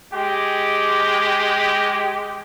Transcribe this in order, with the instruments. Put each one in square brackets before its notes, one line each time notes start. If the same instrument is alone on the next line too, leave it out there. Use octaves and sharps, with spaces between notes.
[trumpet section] G#3 G4